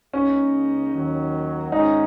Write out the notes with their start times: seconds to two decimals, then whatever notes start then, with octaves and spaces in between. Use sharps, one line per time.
0.13 C#2 C#3 A#3 C#4 D#4
0.93 D#2 D#3 F#3
1.72 G#1 G#2 G#3 C#4 D#4